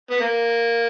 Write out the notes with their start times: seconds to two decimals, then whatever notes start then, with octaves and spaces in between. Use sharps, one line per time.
0.10 B3
0.21 A#3